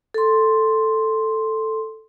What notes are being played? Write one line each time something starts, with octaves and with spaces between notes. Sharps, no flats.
A4 C6